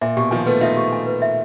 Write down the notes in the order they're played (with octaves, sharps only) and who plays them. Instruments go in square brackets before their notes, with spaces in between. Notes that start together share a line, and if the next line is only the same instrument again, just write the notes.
[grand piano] A#2 [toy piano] E5
[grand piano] B2 [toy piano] G4
[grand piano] D#3 F3 [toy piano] G#5
[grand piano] A3 B3 [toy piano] B4
[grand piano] D#4 F4 [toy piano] E5
[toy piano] G4
G#5
B4
E5